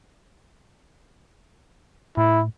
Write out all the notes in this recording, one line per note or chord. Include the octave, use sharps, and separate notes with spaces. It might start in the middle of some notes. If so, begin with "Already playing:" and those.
A2 E4